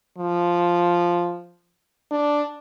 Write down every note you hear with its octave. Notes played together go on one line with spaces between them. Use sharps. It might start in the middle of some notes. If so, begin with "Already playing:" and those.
F3
D4